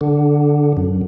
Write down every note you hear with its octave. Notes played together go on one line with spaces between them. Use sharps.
D3
F#2